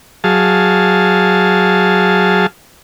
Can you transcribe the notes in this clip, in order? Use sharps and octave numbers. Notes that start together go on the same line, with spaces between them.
F#3 G#4 F5 A5